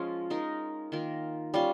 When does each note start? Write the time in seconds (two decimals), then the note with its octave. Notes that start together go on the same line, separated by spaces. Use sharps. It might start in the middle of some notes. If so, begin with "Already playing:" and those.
Already playing: F3 G#3 C#4 F4
0.30 G#3 D#4 A#4
0.92 D#3 A#3 F4 A#4
1.54 G3 C#4 F4